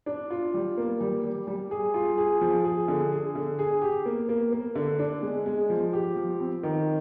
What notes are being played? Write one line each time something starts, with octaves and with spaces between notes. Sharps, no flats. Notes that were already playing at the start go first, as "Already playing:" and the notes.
D4
F4
G3
A#3
G3
G3
G3
G#4
F4
G#4
F3
G#4
D3
G#4
D3
G#4
G4
A#3
A#3
A#3
D3
D4
G#3
G#3
F3
G4
F3
C4
D#3